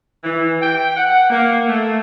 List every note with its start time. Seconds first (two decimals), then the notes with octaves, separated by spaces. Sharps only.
0.24 E3
0.61 G5
0.96 F#5
1.29 A#3
1.66 A3